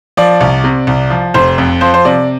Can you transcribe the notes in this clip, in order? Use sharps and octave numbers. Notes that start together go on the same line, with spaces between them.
F3 D5
C2
C3
C2
F3
F1 C5
F2
F3 C5
C5
C3 D5